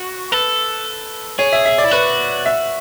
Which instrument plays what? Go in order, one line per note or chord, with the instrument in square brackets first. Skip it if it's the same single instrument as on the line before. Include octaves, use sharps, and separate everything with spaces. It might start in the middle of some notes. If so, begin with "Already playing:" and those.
Already playing: [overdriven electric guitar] F#4
[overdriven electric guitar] A4 [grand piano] B4
[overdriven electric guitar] G#4 [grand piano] C#5
[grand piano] E5
E5
D5
[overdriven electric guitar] E4
[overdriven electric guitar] F#4 [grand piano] B4
[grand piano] E5